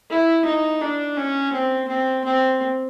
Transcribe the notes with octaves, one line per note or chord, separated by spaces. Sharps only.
E4
D#4
D4
C#4
C4
C4
C4